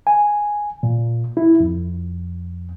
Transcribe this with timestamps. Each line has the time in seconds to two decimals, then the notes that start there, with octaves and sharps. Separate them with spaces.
0.07 G#5
0.83 A#2
1.37 E4
1.60 F2